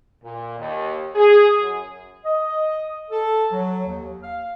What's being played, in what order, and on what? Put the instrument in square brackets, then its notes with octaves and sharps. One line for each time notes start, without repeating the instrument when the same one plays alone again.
[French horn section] A#2
D#2
G#4
F#2
[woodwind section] D#5
A4
F#3
D#2
F5